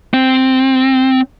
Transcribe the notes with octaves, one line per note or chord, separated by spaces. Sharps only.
C4